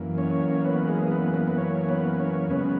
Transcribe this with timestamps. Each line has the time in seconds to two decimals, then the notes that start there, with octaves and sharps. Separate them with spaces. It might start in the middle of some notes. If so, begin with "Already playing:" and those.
Already playing: F#2 E3 A#3
0.18 C#4 C#5
0.65 B3 B4
0.87 G#3 G#4
1.11 B3 B4
1.34 B3 B4
1.48 B4
1.58 C#4 C#5
1.89 B3 B4
2.14 B4
2.19 C#4 C#5
2.50 F#2 C#3 G#3 B3 C#4 B4